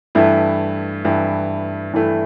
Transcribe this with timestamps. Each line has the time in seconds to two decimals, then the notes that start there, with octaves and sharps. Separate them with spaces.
0.15 G2 E3 A3 E4
1.04 G2 E3 A3 E4
1.93 G2 E3 A3 E4